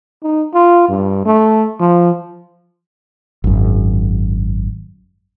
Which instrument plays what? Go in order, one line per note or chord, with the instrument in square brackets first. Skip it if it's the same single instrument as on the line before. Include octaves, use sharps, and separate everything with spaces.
[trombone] D#4
F4
G2
A3
F3
[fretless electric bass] G#1 F#2